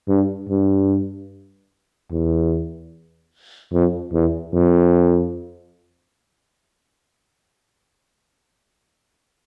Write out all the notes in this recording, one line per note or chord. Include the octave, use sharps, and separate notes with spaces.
G2
G2
E2
F2
E2
F2